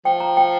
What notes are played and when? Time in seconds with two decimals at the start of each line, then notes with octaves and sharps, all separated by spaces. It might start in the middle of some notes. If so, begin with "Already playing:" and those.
0.05 F3 G5
0.20 A#5
0.37 G5